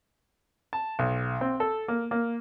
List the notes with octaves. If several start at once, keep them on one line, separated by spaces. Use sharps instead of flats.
A5
B1
C4
A4
A#3
A#3